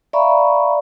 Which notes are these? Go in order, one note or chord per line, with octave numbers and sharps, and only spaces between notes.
D5 E5 F5 A#5 B5 C#6